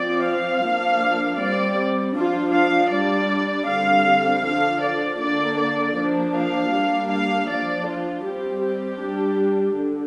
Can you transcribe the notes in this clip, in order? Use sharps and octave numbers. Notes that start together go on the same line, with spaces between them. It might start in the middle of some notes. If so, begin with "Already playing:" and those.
Already playing: F3 C4 D5
F5
F3 A#3 D4
G3 C4 D5
F3 D4 F4
F5
G3 D4 D5
D3 G3 C4 F5
D3 F3 D4 F5
D5
D3 A#3 D4 D5
D5
F3 A#3 D4
F5
G3 A#3 D4
F5
F3 D4 D5
F4
G3 C4 G4
G4
G3 D4
D3